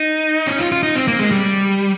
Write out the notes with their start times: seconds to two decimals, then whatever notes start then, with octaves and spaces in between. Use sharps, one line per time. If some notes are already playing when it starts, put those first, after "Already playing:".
Already playing: D#4
0.47 C#4
0.59 F4
0.72 F4
0.83 D#4
0.95 C4
1.08 A#3
1.19 G#3
1.31 G3